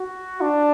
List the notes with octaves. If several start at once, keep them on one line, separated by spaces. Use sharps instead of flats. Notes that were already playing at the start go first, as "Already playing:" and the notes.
Already playing: F#4
D4